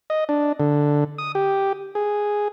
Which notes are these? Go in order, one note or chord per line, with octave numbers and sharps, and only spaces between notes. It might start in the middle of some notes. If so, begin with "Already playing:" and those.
D#5
D4
D3
D#6
G4
G#4